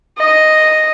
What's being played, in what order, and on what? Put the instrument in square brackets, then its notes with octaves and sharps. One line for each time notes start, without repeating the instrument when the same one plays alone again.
[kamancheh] D#5